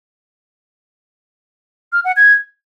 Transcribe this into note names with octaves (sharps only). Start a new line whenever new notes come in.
F6
F#5
G#6